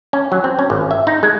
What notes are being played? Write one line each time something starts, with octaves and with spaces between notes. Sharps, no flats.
C#4
F#3
C4
C#4
G#1
E5
D#4
G#3